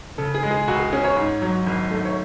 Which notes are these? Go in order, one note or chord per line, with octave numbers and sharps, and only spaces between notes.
C#3 A4
G#4
G#3
G#4
C#2 F#4
G#4
C#4 G#4
C#5
G#2
F#3
G#1
A3
C#5